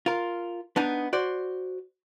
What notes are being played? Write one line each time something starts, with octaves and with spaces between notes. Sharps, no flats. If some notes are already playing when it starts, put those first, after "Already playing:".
F4 A#4
B3 D4 D#4
F#4 C5 D5